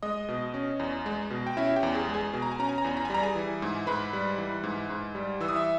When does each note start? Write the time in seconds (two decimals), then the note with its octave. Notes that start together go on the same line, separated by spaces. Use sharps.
0.02 G#3 D#5 D#6
0.28 B2
0.54 C#4
0.80 E2
1.06 G#3
1.30 B2
1.47 G5
1.57 C#4 E4 E5
1.76 G4 G5
1.83 E2
1.94 G#4 G#5
2.08 G#3
2.14 G#4 G#5
2.33 B2 G#5
2.42 A#5
2.52 G#5
2.59 C#4 A#5
2.69 G#5
2.78 A#5
2.85 E2 G#5
2.97 A#5
3.05 G#5
3.10 G3 A#5
3.23 G#4 G#5
3.35 E3
3.62 G#2
3.87 G#2 B4 B5
4.13 G3
4.38 E3
4.64 G#2
4.90 G#2
5.15 G3
5.40 E3 E6
5.48 D#6
5.56 E5 E6